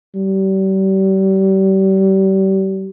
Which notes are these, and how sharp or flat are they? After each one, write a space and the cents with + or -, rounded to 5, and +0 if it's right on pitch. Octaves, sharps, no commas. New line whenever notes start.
G3 -35